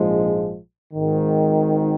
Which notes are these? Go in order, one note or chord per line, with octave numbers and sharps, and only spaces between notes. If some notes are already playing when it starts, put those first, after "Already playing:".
Already playing: A#1 G#2 F3 G#3
G#1 G#2 D#3